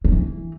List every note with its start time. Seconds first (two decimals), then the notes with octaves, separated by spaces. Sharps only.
0.05 D3
0.12 E3